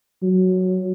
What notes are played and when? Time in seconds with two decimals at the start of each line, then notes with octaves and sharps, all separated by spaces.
0.23 F#3